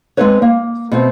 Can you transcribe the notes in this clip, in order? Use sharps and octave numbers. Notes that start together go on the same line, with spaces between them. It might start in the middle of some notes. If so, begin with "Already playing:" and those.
G#3 B3 C4 D#4 B4 C#5
A#3
B2 A3 C4